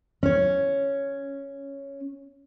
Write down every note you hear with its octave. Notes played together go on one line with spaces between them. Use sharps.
C#4 C#5